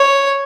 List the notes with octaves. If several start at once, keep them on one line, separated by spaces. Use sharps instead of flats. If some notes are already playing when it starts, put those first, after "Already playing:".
Already playing: C#5